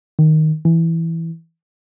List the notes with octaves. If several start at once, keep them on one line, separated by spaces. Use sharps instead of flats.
D#3
E3